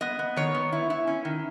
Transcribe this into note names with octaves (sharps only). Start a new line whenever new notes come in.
B3 D#5
B3
D#3 C#5
B3
E4
E4
C#4
D#3